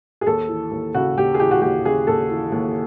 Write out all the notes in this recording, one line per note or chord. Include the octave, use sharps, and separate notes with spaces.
G#4
D#2 A4
E3
D#2
C#3 F#4
D#2 G4
G#4
E3 G4
F#4
D#2 G4
C#3 G#4
D#2 A4
E3
D#2